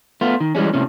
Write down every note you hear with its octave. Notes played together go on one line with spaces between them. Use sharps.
A3 B3 F4
D#3
E3 G3 G#3 C#4
A2 C3 C#4